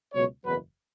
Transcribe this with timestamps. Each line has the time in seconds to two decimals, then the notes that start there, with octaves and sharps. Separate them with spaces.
0.14 C#2 B2 F#3 C#5
0.45 F#1 E2 B2 F#3 B4